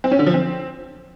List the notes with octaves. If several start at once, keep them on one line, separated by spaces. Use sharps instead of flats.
C4
C#4
D3
F3
C4